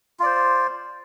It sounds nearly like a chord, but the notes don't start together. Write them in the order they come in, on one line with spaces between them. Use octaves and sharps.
F4 D5 C5